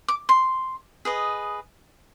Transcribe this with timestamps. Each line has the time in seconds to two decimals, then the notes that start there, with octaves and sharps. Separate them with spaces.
0.08 D6
0.29 C6
1.05 G#4 B4 D#5